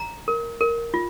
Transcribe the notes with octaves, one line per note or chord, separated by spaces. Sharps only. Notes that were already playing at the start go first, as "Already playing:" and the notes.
Already playing: A#5
A#4
A#4
F4